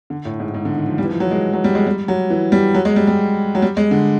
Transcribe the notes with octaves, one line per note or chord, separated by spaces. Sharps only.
D3
A2
G#2
G#2
D3
D#3
F3
G3
E3
F3
F#3
G#3
F#3
G3
G#3
G3
F#3
E3
G3
F#3
G#3
G3
G3
F#3
G3
G#3
D3